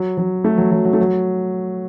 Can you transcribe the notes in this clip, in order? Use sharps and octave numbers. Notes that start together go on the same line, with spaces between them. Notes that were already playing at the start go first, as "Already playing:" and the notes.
Already playing: F#3
F#3
A3
F#3
F#3
F#3
A3
F#3